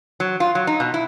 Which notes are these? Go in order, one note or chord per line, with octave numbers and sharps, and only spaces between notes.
F#3
F4
F#3
D#4
B2
E4